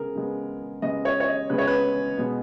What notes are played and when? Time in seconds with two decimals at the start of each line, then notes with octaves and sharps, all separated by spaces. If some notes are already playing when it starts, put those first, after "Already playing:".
Already playing: C#3 G#3 B3 G#4 A#4
0.15 C#3 G#3 B3
0.82 C#3 G#3 B3 D#5
1.05 C#5
1.20 C#5
1.28 D#5
1.50 C#3 G#3 B3 B4
1.58 C#5
1.67 B4
2.18 B2 G#3 B3